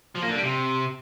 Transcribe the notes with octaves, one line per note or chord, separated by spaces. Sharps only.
F3
A#3
D3
G3
C3